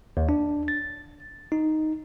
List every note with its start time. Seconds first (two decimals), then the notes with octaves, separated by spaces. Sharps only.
0.17 D#2
0.29 D4
0.68 A6
1.52 D#4